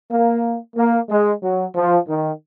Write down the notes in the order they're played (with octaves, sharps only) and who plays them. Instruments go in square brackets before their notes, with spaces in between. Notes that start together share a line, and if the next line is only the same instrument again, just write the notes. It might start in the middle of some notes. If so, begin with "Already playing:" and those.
[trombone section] A#3
A#3
G#3
F#3
F3
D#3